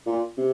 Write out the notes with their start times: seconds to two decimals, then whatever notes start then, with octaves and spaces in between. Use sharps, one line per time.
0.06 A#2
0.38 C3